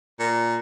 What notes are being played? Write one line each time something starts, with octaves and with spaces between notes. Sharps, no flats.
A#2